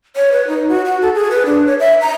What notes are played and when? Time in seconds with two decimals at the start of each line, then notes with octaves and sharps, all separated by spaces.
0.16 C#5
0.32 B4
0.48 D#4
0.69 F#4
0.85 F#4
1.02 A4
1.15 G#4
1.31 B4
1.46 D4
1.66 C#5
1.80 E5
2.01 A#5